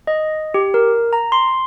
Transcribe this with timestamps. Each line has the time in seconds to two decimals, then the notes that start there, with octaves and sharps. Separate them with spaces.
0.07 D#5
0.54 G4
0.74 A#4
1.13 A#5
1.32 C6